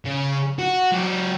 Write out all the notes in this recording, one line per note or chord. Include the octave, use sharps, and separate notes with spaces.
C#3
F#4
F#3 G4